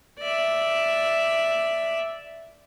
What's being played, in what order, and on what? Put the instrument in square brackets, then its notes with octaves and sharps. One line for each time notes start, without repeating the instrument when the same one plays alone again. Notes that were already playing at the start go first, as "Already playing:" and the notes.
[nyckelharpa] D5 E5